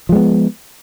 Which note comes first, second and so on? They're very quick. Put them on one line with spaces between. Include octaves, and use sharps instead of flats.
F3 G#3 B3